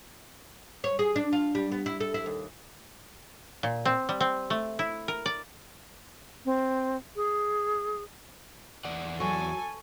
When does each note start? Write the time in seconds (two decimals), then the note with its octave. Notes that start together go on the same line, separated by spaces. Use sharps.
0.84 C#5
0.99 G#4
1.16 D4
1.33 F4
1.55 G3
1.72 B3
1.86 E4
2.01 A4
2.14 E4
2.26 D#2
3.63 A#2
3.85 C4
4.09 G3
4.20 C4
4.50 A3
4.79 E4
5.08 A#4
5.26 D5
6.45 C4
7.16 G#4
8.85 E2 D5 F#5
9.20 F#3 A4 G#5 C#6